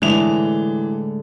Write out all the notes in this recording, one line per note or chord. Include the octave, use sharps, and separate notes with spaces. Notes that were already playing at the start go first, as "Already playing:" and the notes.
A2 D3 E3 G#3 F7